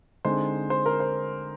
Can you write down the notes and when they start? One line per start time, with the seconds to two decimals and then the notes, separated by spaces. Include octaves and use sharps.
0.25 D3 G#3 C4 D#4 C5
0.70 C5
0.86 A#4
1.00 C5